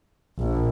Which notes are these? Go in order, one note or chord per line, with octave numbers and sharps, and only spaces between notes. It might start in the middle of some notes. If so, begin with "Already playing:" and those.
A#1